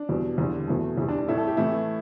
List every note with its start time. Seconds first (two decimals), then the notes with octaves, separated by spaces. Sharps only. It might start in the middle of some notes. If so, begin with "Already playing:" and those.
Already playing: D4
0.09 E2 B2 G3
0.38 E2 D3 G3
0.68 E2 B2 A3
0.98 E2 E3 G3
1.08 D4
1.19 D4
1.28 A2 A3 E4
1.38 A4
1.47 G4
1.57 A2 E3 A3 E4